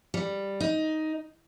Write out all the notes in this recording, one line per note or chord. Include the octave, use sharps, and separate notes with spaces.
G3
D#4